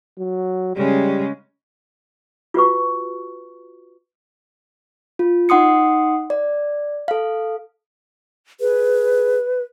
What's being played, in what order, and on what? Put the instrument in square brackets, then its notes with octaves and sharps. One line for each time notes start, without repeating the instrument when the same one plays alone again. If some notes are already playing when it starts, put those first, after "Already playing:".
[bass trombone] F#3
[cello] C#3 G#3 [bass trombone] G3
[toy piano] F4 F#4 B4 C#6
[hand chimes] F4
D#4 F#5 C6 D#6 C#7
D5
A4 F5
[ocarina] G#4 [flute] B4